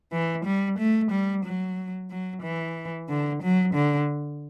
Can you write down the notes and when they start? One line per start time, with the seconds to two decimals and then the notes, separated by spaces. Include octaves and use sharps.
0.12 E3
0.45 G3
0.79 A3
1.11 G3
1.45 F#3
2.10 F#3
2.43 E3
3.09 D3
3.42 F#3
3.74 D3